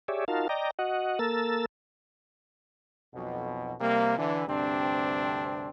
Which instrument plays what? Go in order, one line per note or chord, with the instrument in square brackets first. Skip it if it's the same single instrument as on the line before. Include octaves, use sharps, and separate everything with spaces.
[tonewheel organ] G4 G#4 C#5 D5 E5
D#4 F4 F#4 A#4 F5 A5
D5 D#5 G5 A#5
F#4 D#5 F#5
A#3 A4 A#4 E6 A6
[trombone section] B1 F2 B2
C3 G3 A#3
D3 E3
D2 G2 C3 C4 D4